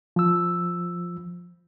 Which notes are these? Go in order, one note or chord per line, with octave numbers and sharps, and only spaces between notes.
F3 E6